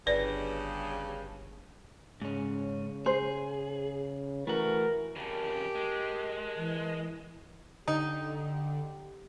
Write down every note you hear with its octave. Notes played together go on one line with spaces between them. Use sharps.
G1 G2 C#3 B4 D5
G#2 C#3 C#4
G#4 C5
E3 A3 F#4 A#4
F2 C#3 G4 A#4 A5
G#3
E3
D3 D#4 G4